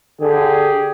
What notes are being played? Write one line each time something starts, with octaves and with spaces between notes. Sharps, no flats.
D3 G4 G#4